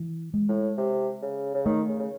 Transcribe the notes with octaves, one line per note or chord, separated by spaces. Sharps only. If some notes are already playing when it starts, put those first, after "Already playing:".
Already playing: E3
G#3
A2
C3
C#3
C#3
D#3 A3
C#3
C#3